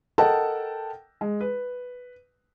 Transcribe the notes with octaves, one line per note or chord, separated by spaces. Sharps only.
A4 A#4 D#5 F#5 G5 A5
G#3
B4